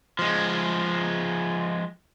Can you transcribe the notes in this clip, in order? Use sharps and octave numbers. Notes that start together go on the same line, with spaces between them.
F3 G#3